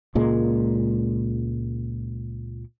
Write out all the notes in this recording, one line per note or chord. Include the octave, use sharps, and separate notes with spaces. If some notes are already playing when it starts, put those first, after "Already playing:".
C#2 A#2 G#3